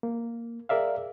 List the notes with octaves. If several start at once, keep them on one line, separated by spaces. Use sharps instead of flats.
A#3
G#4 A#4 D5 E5 F5